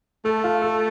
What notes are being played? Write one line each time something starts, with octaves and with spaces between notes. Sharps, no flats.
A3 A4
F4
A4